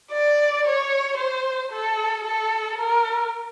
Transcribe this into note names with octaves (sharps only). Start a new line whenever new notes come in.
D5
C#5
C5
A4
A4
A#4